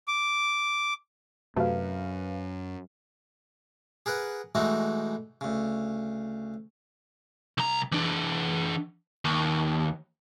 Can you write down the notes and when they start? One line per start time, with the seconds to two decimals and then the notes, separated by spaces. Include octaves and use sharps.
0.08 D6
1.56 F#2 C3 F#3 A3 B4 F5
4.06 G#4 A#4 B4 F#5
4.55 B2 E3 G#3 A3 D#4 F#4
5.41 D2 C#3
7.58 C2 A#5
7.92 E3 D4
9.25 D#2